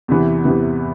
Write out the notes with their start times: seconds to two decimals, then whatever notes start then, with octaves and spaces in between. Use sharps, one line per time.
0.08 E2 C3 E3 B3
0.44 E2 C3 E3 B3